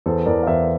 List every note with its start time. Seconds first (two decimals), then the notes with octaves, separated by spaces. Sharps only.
0.06 E2 A4 C5
0.26 E2 A#4 D5
0.43 F5
0.47 E2 C5 E5